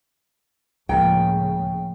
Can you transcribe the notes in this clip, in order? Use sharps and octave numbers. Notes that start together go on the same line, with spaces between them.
C#2 A2 C#3 F3 A#3 A#4 G5